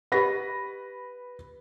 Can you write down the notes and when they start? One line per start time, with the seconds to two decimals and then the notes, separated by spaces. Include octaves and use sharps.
0.12 G4 B4 D#5 F#5 B5 A#6